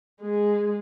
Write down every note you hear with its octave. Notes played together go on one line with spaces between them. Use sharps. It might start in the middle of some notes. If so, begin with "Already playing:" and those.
G#3 G#4